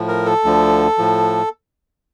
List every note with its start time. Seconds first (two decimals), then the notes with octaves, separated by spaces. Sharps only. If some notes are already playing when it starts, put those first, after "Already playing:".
Already playing: A2 F3
0.08 A#4
0.26 A4
0.44 D2 D3 F3
0.98 A2 F3